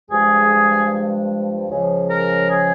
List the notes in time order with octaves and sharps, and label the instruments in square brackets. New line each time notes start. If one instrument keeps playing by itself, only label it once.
[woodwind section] G2 F3 G#3 G#4
C#2 C#3 F3
A#4
G#4